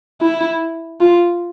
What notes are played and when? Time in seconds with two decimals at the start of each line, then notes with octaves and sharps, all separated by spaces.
0.21 E4
1.01 F4